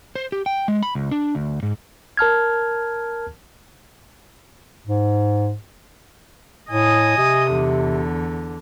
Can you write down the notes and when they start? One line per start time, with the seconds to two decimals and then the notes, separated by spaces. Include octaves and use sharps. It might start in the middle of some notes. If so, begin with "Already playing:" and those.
0.15 C5
0.32 G4
0.46 G5
0.68 G#3
0.83 B5
0.95 C#2
1.11 D4
1.35 D2
1.63 G#2
2.17 A#4 A5 F6 G#6
4.87 G#2
6.71 A2 D#5 G#5 D#6
7.17 C3
7.52 E2 D3